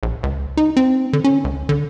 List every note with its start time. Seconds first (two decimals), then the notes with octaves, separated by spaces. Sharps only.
0.03 A#1
0.23 C#2
0.57 D#4
0.77 C4
1.13 D3
1.24 C#4
1.44 C#2
1.69 D3